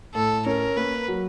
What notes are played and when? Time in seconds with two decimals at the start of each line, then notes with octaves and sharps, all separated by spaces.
0.15 A2 A4
0.46 C#4 A#4
0.77 A#3 B4
1.08 F#3